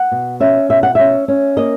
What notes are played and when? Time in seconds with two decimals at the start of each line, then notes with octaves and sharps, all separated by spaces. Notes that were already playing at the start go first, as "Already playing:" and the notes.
Already playing: F#5
0.12 B2
0.40 C#4 E5
0.69 B2 E5
0.83 F#5
0.95 C#4 E5
1.28 C#4
1.57 A#3 D#5